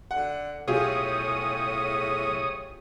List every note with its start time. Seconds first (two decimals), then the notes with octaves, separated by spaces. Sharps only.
0.11 D3 F#5
0.68 B1 A2 F4 G4 G#4 C#5 D#6